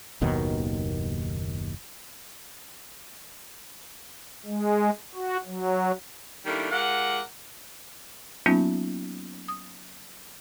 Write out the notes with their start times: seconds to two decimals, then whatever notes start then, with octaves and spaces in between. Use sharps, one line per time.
0.22 F#1 D#2 B2 D#3
4.45 G#3
5.15 F#4
5.45 F#3
6.46 D#3 G3 A3 A#3 D4 E4
6.71 G#3 F4 G4 A#4 F#5
8.46 F#3 A#3 B3 C#4 D#4 F4
9.48 D#6